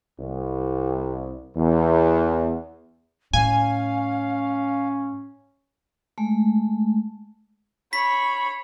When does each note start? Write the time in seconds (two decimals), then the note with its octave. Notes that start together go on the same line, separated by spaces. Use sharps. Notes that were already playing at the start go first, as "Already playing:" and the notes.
0.20 C2
1.55 E2
3.33 A2 C#4 F5 G#5
6.18 G#3 A3
7.93 C#5 B5 B6